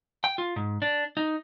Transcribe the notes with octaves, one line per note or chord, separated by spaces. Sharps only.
G5
F4
G#2
D4
D#4